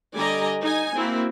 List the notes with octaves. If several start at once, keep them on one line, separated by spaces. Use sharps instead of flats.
D3 G3 D5 D#5 G#5 A#5
D#4 G#5
A#3 C4 E4 F#4